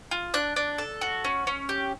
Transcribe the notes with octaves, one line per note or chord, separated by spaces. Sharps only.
F4
D4 F#6
D4
A4
F#4
C#4
C#4
G4